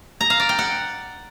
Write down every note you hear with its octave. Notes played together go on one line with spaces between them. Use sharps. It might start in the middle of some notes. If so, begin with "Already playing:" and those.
A#5
F5
D5
G5
F#5